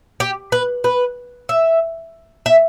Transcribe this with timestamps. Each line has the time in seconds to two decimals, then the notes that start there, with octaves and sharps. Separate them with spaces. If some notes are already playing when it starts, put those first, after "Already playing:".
0.20 G4
0.52 B4
0.84 B4
1.49 E5
2.46 E5